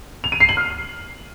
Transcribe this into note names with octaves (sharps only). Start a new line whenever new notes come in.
F7
D#7
C7
F#7
F6